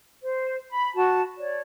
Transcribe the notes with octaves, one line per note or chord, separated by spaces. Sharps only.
C5
B5
F#4 A5
C#5 D5